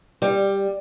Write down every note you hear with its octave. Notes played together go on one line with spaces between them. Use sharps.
G3